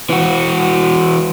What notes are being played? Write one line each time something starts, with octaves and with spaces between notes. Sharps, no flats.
E3 F#4